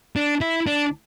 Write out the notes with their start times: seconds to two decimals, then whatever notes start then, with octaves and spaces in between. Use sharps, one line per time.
0.16 D4
0.41 E4
0.67 D4